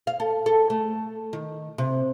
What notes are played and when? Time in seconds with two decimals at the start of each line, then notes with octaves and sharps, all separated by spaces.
0.07 F5
0.20 A4
0.46 A4
0.70 A3
1.33 D#3
1.78 C3